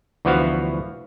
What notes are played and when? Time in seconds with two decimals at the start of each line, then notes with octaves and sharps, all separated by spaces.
0.25 D2 E3 F3 B3 F#4 F5